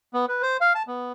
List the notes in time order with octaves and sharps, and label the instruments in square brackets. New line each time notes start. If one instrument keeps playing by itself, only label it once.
[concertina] B3
B4
C5
F5
A5
B3